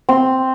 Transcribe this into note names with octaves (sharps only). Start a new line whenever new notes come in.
C4